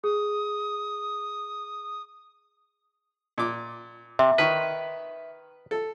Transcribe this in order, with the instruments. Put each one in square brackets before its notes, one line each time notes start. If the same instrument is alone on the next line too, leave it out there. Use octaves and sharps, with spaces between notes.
[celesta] G#4 [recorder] D#6
[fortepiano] A#2 D6
[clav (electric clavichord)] C3 [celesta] E5
[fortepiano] D#3 C#5 [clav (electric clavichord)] B4
[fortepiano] A4